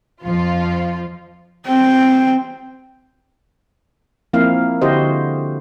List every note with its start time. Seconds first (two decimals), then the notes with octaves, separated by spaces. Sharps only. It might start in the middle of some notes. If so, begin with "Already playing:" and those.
0.23 F2 F3 F4
1.67 C4 G5
4.33 F3 A#3 C4 E4 F5
4.81 D3 E4 F#4 G4 C5 D#5